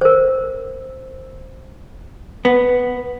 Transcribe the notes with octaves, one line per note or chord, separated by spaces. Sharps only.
A#4 C5
B3